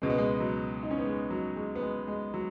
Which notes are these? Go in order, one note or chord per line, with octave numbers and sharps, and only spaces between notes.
C#2 B2 G#3
B3
G#3
F#3
D#4
C#4
B3
G#3
F#3
G#3
B3
G#3
G#3
F#3